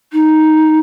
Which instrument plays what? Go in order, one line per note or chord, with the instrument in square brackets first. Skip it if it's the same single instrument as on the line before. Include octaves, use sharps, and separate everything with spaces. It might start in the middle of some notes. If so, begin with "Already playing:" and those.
[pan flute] D#4